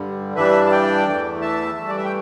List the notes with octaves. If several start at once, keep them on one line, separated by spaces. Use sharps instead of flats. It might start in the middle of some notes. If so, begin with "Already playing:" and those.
Already playing: G2 D3 G3
G2 E3 G3 D4 B4 E5
A5
D5 G5
E2 E3 A3
E5 A5
G2 E3 A3
D5
E5
G5